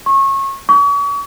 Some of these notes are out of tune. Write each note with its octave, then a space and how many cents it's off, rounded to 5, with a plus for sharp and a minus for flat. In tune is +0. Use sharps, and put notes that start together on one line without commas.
C#6 -25
C#6 +40